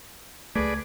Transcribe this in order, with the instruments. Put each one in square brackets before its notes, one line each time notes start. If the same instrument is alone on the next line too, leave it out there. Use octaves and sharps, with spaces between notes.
[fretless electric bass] C#2 A3 [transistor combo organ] G#4 B4 D5